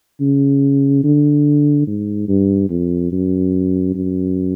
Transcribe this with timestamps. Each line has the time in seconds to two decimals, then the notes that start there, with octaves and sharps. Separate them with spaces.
0.20 C#3
1.04 D3
1.87 G#2
2.28 G2
2.70 F2
3.12 F#2
3.95 F#2